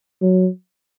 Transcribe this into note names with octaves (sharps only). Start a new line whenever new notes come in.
F#3